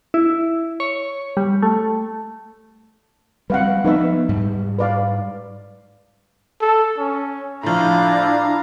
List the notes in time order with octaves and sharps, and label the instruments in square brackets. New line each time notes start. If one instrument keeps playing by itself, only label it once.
[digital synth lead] E4
C#5
G3
A3
[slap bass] G3 C4 [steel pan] B4 F5 F#5
[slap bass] F3 B3 [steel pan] D#4 B4 E5
[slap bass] G#2 G3
[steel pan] B4 D5 F5
[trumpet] A4
C#4
[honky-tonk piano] A2 F3 [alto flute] D4 [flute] E4 [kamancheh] F5 A#5